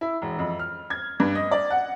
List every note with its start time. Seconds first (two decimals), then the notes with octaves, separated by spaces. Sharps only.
0.01 E4
0.22 E1
0.38 F2
0.59 F6
0.90 G#6
1.20 G2
1.35 D#5
1.51 D5
1.70 F#5